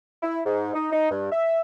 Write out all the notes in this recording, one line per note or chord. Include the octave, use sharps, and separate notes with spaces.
E4
G#2
D#4
D#4
G2
E5